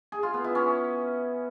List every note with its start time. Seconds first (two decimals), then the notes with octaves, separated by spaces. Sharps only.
0.12 G#4
0.23 F4
0.34 B3
0.44 E4
0.55 C#4